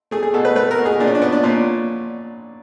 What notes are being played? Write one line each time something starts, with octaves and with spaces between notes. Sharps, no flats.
A3 G#4
G#4
B2 A4
B4
A3 B4
A#4
B2
G#4
A#2 D4
C#4
D4
B3
D4
A#2 C#4